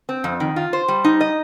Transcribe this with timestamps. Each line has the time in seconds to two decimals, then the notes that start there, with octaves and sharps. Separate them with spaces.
0.09 C4
0.24 F2
0.40 D#3
0.56 F4
0.73 C5
0.88 G3
1.04 D#4
1.21 D#5